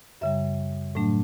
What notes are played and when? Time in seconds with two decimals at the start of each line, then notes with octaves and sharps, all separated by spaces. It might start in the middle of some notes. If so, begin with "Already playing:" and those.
0.21 F#2 C#3 G3 E5
0.95 A2 F#3 A3 D4